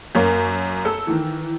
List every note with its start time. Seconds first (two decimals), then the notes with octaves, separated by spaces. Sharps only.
0.15 F#2 A#3 C#5
0.85 A4 E6
1.07 D#3 E3